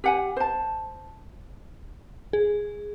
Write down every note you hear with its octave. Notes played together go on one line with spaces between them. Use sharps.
G4 F#5 G#5
C5 A5
G#4